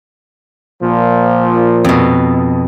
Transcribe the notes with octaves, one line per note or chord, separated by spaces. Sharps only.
A#2 F3
F2 B2